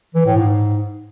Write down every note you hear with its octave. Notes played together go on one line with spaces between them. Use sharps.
E3
A2
G#2